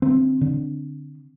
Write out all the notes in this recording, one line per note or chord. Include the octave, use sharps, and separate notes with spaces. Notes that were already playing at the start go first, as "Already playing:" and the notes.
D3 C4
D3